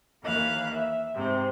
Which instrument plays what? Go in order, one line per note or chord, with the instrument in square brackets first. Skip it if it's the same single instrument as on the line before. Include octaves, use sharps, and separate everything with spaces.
[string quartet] D#2 E3 A#3 F5 F#6
E5
G#2 C3 C4